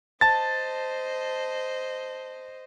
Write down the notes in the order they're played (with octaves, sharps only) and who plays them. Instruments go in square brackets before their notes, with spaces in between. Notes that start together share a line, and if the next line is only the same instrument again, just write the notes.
[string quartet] C5 D#5 [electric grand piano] A5 A6